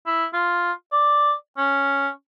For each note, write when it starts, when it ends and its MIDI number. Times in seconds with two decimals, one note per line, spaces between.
0.07 0.26 64
0.34 0.72 65
0.92 1.33 74
1.58 2.09 61